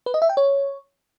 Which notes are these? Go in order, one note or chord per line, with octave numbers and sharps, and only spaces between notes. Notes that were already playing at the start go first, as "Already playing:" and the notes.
B4
D#5
E5
G5
C#5